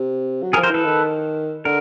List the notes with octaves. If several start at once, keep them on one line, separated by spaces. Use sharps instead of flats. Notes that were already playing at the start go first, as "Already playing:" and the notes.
Already playing: C3
F#3
G#4 A#4
F3
A#4 C5
E3 A4 B4
D#3
D3 A#4